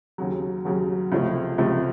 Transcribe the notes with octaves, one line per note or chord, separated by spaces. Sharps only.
D#2 C#3 F#3
D#2 C#3 F#3
C#2 C3 F3 A3
C#2 C3 F3 A3